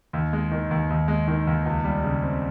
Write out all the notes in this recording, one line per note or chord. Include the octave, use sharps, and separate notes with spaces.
D#2
G#3
D#3
D#2
D#2
G#3
D#3
D#2
C#2
G3
C#3
C4